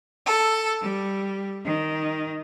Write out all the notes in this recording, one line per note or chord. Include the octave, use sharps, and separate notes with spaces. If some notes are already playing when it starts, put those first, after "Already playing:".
A4
G3
D#3